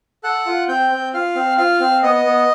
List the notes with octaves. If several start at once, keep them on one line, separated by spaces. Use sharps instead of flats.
A4 F#5 F#6
F4
C4 G5 G6
C4
F4 F5 F6
C4
F4 F5 F6
C4
B3 D#5 D#6
B3